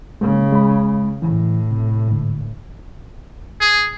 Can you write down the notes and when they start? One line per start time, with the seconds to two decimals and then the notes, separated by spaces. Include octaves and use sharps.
0.21 C#3 G#3 A#3
0.52 G#3 B5
1.22 A2 E3
1.71 C3
2.08 G#2 D3
3.61 G#4